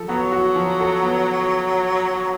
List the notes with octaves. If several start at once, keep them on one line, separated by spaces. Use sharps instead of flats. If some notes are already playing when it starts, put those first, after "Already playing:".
Already playing: F3 A4
F#3 B3
F#4
F3
A4
B3